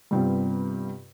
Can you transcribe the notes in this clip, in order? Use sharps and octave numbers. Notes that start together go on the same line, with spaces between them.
G2 C3 G3 B3 C4 F4